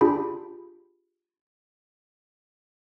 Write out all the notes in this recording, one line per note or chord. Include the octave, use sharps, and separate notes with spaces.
D4 F4 G4 G#4 B5